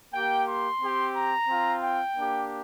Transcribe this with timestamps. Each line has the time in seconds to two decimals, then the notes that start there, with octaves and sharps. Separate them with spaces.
0.14 A#3 G4 G5
0.48 C6
0.81 C4 G4
1.15 A#5
1.49 C4 F4
1.82 G5
2.17 A#3 D4 G4